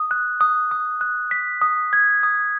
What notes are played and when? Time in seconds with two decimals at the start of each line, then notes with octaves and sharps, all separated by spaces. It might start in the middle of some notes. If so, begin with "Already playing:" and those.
Already playing: D#6
0.11 F#6
0.41 D#6
0.71 D#6
1.01 F#6
1.31 B6
1.62 D#6
1.93 G#6
2.23 D#6